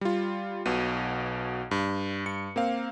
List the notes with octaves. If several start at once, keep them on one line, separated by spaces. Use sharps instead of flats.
G3 F4
B1 B2 D#7
G2
G2 C#7
A#3 C4 F5